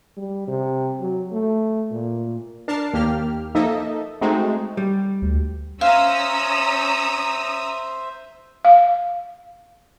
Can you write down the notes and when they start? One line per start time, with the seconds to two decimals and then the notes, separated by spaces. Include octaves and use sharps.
0.17 G3
0.47 C3
1.00 F#3
1.32 A3
1.91 A#2
2.68 D4 A#4 A5 F6 C7
2.93 D#2 A#3 G4 F6
3.55 F3 A#3 D#4 A4 D#5 E5
4.21 G#3 A3 C4 D#4 F#4
4.77 G3
5.22 D2
5.81 C#4 C5 E5 F5 A#5 D#6 E6
8.65 F5